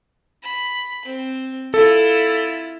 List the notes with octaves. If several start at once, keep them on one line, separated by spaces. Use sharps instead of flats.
B5
C4
E4 F4 A4